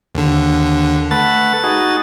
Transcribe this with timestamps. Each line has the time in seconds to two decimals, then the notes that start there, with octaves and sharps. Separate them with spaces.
0.15 D#2 D3
1.11 A3 B4 F#5 A6
1.64 D#4 F#4 G#4